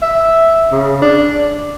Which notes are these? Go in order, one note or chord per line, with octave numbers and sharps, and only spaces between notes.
E5
C#3
D4